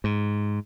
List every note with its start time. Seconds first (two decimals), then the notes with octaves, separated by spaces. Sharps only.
0.04 G#2